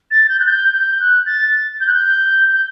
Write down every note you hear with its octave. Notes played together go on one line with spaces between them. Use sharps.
A6
A6
G6
F#6
G6
G6
F#6
A6
G6
F#6
G6
G6